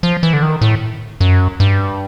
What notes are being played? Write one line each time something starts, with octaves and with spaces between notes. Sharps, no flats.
F3
E3
D3
D#3
A2
F#2
G2